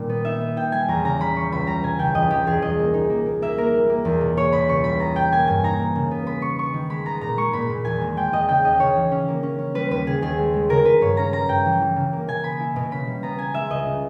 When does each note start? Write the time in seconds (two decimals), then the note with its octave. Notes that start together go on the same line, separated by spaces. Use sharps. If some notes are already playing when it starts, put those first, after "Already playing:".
Already playing: A#2 D#3 G3
0.09 B3
0.25 D#4 E5
0.41 B3
0.57 D#4 G5
0.72 G3 G#5
0.88 E2 A#5
1.05 C#3 A#5
1.20 G3 B5
1.36 G3 C#6
1.52 C#2 B5
1.67 G3 A#5
1.83 B2 G#5
1.99 C#2 G5
2.15 E2 D#5
2.30 E2 G4
2.47 E2 G#4
2.62 E2 D#5
2.79 A#3
2.94 D#4
3.10 A#3
3.26 A#3
3.42 A#3 E5
3.58 A#3 A#4
3.73 G3
3.90 A#3
4.05 E2
4.21 B2
4.37 B2 C#5
4.53 B2 B5
4.69 C#2 C#6
4.84 G3 B5
5.00 B3 A#5
5.16 B2 G5
5.32 A#3 G#5
5.47 G2 G#5
5.64 D#4 A#5
5.79 A#3
5.95 C#3
6.11 B3
6.26 B3 B5
6.42 B3 C#6
6.58 B3 C#6
6.74 D#3
6.90 G#3 B5
7.06 B3 A#5
7.21 A#2 A#5
7.37 G#3 C#6
7.53 A#2 B5
7.70 A#2
7.85 E2 G#5
8.01 G#3
8.17 G#3 G5
8.33 E2 D#5
8.49 C#3 G5
8.64 D#2 D#5
8.80 C#3 C#5
8.96 E3
9.11 C#4
9.28 A#3
9.43 C#4
9.59 C#4
9.75 G3 B4
9.91 D#2 B4
10.06 C#3 G#4
10.22 D#2 G#4
10.39 G#3
10.54 G#3
10.69 C#3 A#4
10.85 C#3 B4
11.01 G2 C#5
11.17 C#4 A#5
11.33 G3 A#5
11.49 G2 G5
11.66 E3
11.81 E3
11.96 C#3
12.13 A#3
12.28 B2 G#5
12.44 B3 B5
12.60 E4
12.76 B2
12.91 C#3 B5
13.07 G3
13.23 B3 A#5
13.39 B3 G#5
13.54 G#3 E5
13.70 C#2 D#5
13.86 C#3